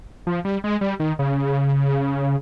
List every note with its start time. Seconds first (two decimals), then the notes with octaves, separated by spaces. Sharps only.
0.27 F3
0.45 G3
0.64 G#3
0.81 G3
1.00 D#3
1.19 C#3